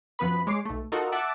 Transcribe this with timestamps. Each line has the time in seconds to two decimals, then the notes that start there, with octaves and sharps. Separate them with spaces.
0.19 F#2 F3 B3 B4 B5
0.47 G#3 C#5 D6 C7
0.65 B1 A3
0.92 D#4 F4 F#4 A4 A#4
1.12 E5 F#5 A5 D6